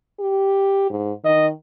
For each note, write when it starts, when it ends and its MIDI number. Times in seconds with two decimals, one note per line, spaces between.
0.19 0.86 67
0.90 1.12 44
1.24 1.51 51
1.24 1.47 75